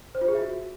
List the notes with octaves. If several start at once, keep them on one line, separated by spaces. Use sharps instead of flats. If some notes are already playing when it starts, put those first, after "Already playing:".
C5
F4
G#4
E5
F#4